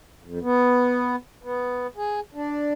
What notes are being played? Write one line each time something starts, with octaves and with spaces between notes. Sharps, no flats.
F2
B3
B3
G#4
D4